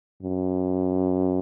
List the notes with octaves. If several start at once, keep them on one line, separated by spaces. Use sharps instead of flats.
F#2